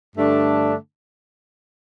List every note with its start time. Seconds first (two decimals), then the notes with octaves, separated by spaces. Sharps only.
0.16 G2 D3 A3 D4